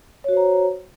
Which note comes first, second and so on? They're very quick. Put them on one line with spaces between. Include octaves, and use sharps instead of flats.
C#5 F#4 C5 A#5